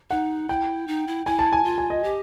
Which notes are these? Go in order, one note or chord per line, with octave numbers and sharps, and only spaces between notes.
D#4 F#5
E4 G5
D#4
E4
E4 G#5
A5
G#5
F4
G#5
D#5
G4